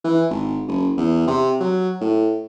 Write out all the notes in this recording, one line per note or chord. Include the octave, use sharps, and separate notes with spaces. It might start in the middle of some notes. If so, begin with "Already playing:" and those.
E3
G#1
F#1
E2
C3
F#3
A2